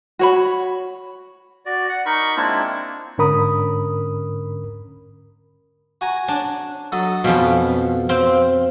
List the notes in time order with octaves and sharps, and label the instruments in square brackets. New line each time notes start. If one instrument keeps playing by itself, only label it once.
[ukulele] F#4 C#5 B5
[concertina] F#4 D5
F#5
D#4 A#4 B5 C#6
G#3 A#3 C4 D4 E4 F4
[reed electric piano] G#2 D3 C#4 A#4 B5 D#6
[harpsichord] F#4 G#5 A#5
[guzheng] D4
[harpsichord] F#3 A4 D#5
[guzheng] F2 B2 [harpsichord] F3 C#4 F4
[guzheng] C4 [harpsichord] F5